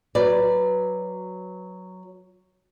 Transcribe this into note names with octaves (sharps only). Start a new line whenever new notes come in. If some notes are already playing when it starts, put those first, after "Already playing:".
F#3 B4 D5